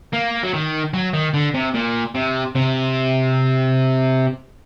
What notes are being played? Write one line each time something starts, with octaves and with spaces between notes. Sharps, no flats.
A#3
F#3
D#3
F#3
D#3
D3
C3
A#2
C3
C3